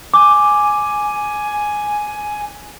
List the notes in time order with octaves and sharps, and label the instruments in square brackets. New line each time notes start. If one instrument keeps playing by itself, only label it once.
[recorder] G#5 [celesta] D6